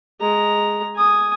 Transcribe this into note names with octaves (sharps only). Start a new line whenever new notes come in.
G#3 A#5
G#5 D#6